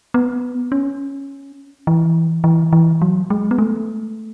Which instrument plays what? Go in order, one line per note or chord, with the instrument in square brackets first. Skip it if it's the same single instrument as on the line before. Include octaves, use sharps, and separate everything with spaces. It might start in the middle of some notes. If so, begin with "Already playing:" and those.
[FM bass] B3
C#4
E3
E3
E3
F#3
G#3
B3
A3